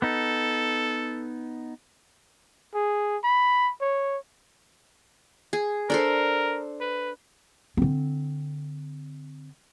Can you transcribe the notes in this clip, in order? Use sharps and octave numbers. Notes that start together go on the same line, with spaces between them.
B3 D#4 A4
G#4
B5
C#5
G#4
D4 A4 A#4 C5
B4
D3 C4